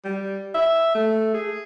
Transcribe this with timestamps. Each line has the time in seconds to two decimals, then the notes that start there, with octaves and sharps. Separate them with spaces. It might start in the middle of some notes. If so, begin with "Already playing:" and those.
0.04 G3
0.55 E5
0.95 A3
1.34 G#4